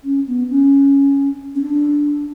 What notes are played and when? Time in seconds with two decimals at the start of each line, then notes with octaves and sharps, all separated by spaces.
0.04 C#4
0.27 B3
0.50 C#4
1.55 C#4
1.62 D4